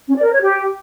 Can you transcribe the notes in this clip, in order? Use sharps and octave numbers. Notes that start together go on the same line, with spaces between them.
C#4
D5
A#4
C#5
G4